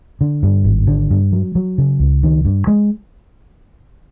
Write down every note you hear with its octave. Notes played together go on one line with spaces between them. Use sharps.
D3
G2
G#1
D3
G2
F#3
F#3
C#3
C#2
D#3
G2
G#3